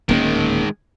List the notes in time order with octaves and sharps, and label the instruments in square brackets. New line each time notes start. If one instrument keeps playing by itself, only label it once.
[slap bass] D1 A#3 C#4 [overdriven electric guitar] D#3 G#3